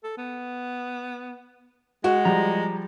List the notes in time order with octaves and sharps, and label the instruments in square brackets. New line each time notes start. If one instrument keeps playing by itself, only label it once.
[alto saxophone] A4
B3
[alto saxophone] G#3 [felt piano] F#4
[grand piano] F3 G3 G4 [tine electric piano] A#5